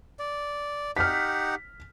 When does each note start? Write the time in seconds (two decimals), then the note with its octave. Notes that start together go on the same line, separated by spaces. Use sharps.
0.19 D5
0.97 D#4 G4 F#5 F6 B6